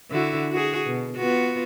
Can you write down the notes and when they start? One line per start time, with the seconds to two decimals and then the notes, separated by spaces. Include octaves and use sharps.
0.10 D3 E4 F#4
0.51 F#4 G#4
0.85 B2
1.17 B3 F4 F#4